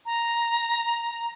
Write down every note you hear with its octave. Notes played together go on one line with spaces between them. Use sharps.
A#5